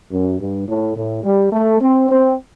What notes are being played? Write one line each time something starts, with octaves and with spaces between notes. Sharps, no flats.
F#2
G2
A2
A2
G3
A3
C4
C4